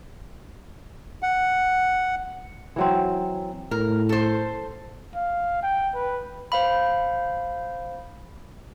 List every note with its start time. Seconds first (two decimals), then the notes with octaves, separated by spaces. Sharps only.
1.23 F#5
2.76 E3 F#3 C4
3.71 A2 A#4
4.09 A4 C5
5.15 F5
5.63 G5
5.95 B4
6.52 C5 F5 B5